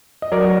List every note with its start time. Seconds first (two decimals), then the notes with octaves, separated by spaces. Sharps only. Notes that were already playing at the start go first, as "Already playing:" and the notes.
0.22 D#5
0.32 F#3 A#4 D5